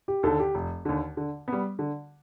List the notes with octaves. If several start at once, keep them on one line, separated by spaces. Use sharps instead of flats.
G4
D#2 D3 A4
G4
F1
D#2 D3
D3
G3 B3
D3